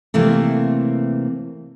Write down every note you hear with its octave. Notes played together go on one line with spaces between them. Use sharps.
C3 E3 A3 A#3 C4